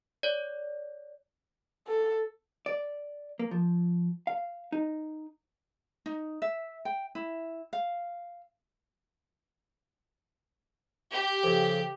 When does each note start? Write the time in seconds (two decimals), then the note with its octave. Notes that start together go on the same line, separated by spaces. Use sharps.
0.23 C#5 D5
1.88 A4
2.66 D5
3.39 A#3
3.51 F3
4.27 F5
4.72 D#4
6.06 D#4
6.42 E5
6.85 G5
7.15 E4
7.73 F5
11.12 G4
11.43 F2 C#3